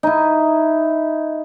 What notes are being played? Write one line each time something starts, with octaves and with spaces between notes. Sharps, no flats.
D#4 E4